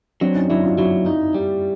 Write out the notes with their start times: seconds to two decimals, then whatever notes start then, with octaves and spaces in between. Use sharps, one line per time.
0.21 F#3 C4 D4
0.35 C#4 D#4
0.49 F#3 D4 E4
0.64 D#4 F4
0.78 F#3 E4 F#4
1.06 D#4
1.34 G3